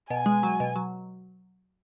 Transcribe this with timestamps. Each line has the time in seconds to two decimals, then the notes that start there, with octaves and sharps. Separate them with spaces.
0.10 B2 G#5
0.26 G#3
0.43 F#3
0.60 B2
0.76 F#3